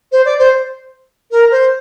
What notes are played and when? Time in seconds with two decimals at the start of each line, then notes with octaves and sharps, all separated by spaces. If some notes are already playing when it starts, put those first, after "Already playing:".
0.12 C5
0.25 D5
0.39 C5
1.31 A#4
1.51 C5